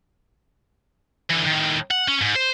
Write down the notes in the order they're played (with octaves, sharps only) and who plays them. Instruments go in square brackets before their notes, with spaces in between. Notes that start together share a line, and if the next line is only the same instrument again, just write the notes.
[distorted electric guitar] D3 E3
A2 D#3
F#5
C#4
G#2
C5